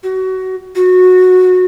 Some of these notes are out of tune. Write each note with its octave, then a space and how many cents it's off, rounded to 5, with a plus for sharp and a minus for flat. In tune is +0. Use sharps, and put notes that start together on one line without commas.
F#4 +25
F#4 -15